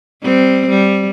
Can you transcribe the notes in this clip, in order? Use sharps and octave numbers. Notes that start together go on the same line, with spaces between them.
G3 C4
G3